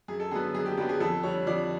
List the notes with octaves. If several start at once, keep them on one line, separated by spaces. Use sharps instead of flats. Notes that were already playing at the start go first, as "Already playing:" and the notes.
F#2 G#4
A4
D3 F#3 B3 G#4
F#2 G#4
G4
D3 F#3 B3 G4
G#4
F2 A4
D3 G3 C#5
F2 D5